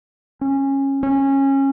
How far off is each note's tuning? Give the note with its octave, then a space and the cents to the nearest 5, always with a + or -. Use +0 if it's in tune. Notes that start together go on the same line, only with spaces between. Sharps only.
C#4 -20
C#4 -20